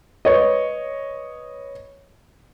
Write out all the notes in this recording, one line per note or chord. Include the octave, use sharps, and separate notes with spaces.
B4 C#5 D#5